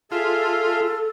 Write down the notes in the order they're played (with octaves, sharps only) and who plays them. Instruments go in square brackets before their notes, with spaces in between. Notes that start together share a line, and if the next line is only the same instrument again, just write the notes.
[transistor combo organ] F4 [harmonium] G#4 E5 A5 [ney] A4